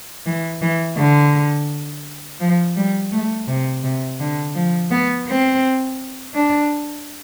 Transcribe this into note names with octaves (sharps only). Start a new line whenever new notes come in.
E3
E3
D3
F3
G3
A3
C3
C3
D3
F3
B3
C4
D4